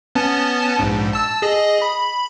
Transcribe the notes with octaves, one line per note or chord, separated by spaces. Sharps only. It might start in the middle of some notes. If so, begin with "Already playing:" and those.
B3 C#4 A5
A#1 G#2
A5 E6
G#4 D#5
B5